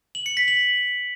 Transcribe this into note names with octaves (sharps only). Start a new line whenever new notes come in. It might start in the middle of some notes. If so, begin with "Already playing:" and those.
F#7
C#7
B6
F#7